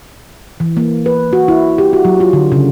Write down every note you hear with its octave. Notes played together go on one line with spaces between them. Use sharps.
E3
A#3
B4
F#4
E4
G4
F#4
F#3
F4
D3
C#3